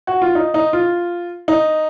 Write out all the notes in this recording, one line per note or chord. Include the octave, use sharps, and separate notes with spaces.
F#4
F4
D#4
D#4
F4
D#4